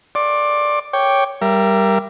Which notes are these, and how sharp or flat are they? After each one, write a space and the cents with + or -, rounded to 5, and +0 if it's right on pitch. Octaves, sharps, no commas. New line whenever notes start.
D5 +5 C6 +35
C#5 +0 G5 +0 D6 +0
G3 +0 A#4 +0 E5 +35